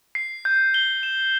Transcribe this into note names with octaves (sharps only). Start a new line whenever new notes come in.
C7
G6
G7
E7